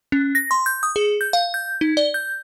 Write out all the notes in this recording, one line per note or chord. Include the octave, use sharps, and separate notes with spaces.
C#4
A#6
C6
G6
D#6
G#4
G6
F5
G6
D#4
D5
G6